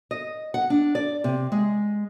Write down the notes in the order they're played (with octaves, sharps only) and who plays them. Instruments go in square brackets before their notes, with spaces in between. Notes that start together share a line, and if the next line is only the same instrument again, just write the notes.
[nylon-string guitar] D#5
F#5
D4
D5
C3
G#3